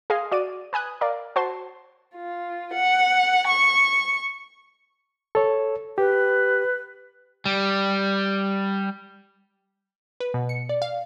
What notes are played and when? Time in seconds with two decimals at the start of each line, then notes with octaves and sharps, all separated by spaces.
0.10 G#4 D#5 F5 G#5 C6
0.31 F#4 D5 D#7
0.73 B4 G#5 D#6 F#6
1.01 A#4 D5 F5
1.36 F#4 C5 A5 C6
2.15 F4
2.73 F#5
3.48 C#6
5.35 A4 C#5
5.98 G4 B4
7.45 G3
10.20 B4
10.34 B2
10.49 C#7
10.69 D5
10.82 F5